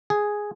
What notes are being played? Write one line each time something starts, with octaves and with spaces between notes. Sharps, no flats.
G#4